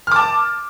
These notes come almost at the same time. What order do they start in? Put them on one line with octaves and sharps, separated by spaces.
F6 D6 A5